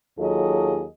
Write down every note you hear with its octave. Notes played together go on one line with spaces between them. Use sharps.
D#2 F#3 F4 G#4 A4 D#5